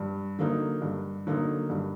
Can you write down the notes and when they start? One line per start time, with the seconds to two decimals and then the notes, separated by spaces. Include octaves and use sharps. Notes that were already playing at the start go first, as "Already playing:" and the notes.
Already playing: G2
0.38 D3 F#3 A#3 D#4
0.82 G2
1.27 D3 F#3 A#3 D#4
1.70 G2